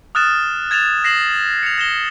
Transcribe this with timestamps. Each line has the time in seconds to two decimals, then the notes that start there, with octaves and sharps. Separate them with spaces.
0.15 D#6 F6 F#6 A6 E7
0.71 G#6 A6 E7 F7
1.04 A#6 C7 E7 F#7
1.63 C#7 F7
1.78 A#6 E7 G7